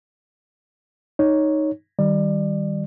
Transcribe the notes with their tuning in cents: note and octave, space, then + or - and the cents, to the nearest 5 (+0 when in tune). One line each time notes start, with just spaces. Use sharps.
D#4 +0 C#5 +0
D#3 +0 G3 +0 D5 +30